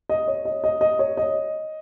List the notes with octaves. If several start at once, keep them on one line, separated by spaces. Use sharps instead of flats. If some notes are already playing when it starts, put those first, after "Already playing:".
D#5
C#5
D#5
D#5
D#5
C#5
D#5